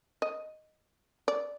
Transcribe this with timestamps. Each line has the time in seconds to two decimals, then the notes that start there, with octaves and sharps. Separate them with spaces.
0.22 D#5
1.28 D5